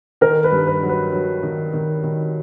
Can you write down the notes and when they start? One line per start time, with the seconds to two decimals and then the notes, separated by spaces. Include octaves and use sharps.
0.21 D#3 A#4
0.44 B4
0.52 G2
0.67 B4
0.83 F#3
0.89 B4
1.13 F#3
1.43 D#3
1.73 D#3
2.04 D#3